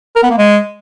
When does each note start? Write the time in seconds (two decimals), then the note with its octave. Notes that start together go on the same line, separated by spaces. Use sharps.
0.16 A#4
0.23 B3
0.30 A#3
0.38 G#3